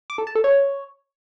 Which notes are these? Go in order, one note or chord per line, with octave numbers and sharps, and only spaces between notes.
D6
A4
A5
A4
C#5